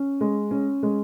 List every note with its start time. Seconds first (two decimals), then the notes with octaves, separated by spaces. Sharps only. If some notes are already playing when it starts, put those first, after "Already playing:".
Already playing: C#4
0.21 G#3
0.51 C#4
0.83 G#3